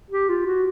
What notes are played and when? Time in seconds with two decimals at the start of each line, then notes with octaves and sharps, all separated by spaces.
0.11 G4
0.29 F4
0.47 F#4